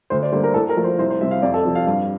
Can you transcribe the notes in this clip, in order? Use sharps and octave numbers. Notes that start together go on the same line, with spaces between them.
D2 C5
D5
D3 G3 A#3 C5
A#4
A2 A4
A#4
F3 A3
C5
C2 C5
C5
C3 G3 C4 E5
F5
F2 D5
A4
C3 F3
F5
G2 F5